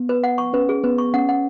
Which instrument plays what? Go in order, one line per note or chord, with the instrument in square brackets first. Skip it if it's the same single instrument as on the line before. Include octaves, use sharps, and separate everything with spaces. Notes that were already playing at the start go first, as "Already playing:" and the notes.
Already playing: [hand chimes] B3
[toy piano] B4
F#5
C#6
[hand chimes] C#4 [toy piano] B4
[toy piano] G#4
[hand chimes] B3 [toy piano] B4
[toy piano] C#6
[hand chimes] C#4 [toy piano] F#5
[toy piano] F#5